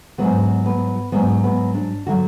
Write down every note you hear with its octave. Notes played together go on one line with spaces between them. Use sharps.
G#2 F#3 B3
B3
G#2 F#3 B3
B3
D4
D3 F#3 F#4